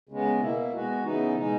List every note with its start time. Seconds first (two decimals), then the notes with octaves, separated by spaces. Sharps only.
0.09 C#3 G#3 B3
0.41 B2 A#3 E4
0.72 G#3 B3 F#4
1.04 C#3 E3 B3 D#4
1.35 B2 G#3 D#4